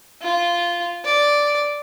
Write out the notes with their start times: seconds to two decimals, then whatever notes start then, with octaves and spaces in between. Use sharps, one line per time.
0.22 F4
1.05 D5